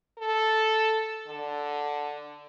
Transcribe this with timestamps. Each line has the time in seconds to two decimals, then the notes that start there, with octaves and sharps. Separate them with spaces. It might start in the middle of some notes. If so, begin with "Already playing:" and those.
0.18 A4
1.28 D3